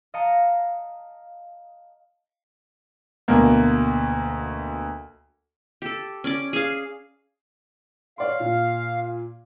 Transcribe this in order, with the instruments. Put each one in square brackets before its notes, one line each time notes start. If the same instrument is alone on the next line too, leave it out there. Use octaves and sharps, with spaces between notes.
[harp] D#5 F5 A5 A#5 C#7
[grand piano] D2 B2 A#3
[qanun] G4 A4
C#4 D5 D6
G#4 F5
[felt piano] C#5 D5 C6 [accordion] F5
[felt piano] A#2